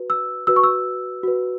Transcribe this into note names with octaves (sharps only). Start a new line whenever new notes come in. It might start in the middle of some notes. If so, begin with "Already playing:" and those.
Already playing: F#4 B4
E6
F#4 B4 E6
C#6
E6
F#4 B4